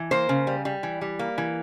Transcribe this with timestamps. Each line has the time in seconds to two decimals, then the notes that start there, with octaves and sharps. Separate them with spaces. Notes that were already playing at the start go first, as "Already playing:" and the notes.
Already playing: E3
0.11 A#3 C5
0.29 C#3
0.47 G3
0.65 G3
0.83 E3
1.01 G3
1.19 A#3
1.38 E3